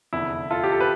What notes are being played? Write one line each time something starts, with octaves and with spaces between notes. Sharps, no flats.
F1 E2 D3 E4
F4 A4
G4
A4
B4